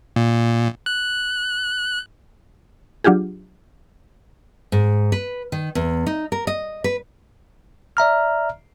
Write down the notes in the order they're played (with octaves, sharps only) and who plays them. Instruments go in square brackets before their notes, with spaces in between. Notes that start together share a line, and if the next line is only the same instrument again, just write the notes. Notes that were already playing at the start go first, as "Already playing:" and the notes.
[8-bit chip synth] A#2
F#6
[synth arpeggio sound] F#3 D4 F4 G4 G#4
[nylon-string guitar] G#2
B4
D#3
E2
D#4
A#4
D#5
B4
[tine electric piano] D5 E5 A#5 F6